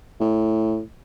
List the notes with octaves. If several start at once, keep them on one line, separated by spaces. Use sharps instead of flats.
A2